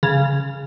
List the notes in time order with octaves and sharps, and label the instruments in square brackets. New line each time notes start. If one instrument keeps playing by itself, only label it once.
[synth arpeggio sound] C#3